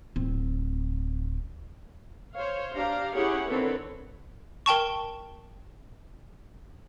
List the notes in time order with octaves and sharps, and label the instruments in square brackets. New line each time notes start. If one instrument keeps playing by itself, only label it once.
[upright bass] D1 C4
[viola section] C5 C#5 F5
D4 G4 F5 A#5
C#4 E4 G4 G#4 C#5 F#5
D3 D#3 C4 A4 B4 C#5
[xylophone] A#4 G5 A5 C#6